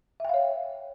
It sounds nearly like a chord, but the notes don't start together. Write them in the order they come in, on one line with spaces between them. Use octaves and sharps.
E5 G5 F5 C#5